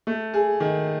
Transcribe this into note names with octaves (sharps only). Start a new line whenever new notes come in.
A3
G#4
D#3